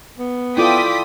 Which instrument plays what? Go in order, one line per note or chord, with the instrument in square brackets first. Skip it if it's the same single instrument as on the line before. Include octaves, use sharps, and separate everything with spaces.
[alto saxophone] B3
[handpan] E4 F4 A4 [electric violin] D5 [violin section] G5 D#6 B6